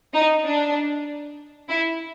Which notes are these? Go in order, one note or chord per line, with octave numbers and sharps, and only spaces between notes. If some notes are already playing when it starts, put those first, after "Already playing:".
D#4
D4
E4